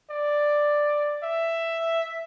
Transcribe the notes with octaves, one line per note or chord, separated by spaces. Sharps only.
D5
E5